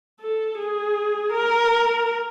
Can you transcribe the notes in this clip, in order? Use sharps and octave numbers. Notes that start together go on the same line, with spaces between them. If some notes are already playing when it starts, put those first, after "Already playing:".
A4
G#4
A#4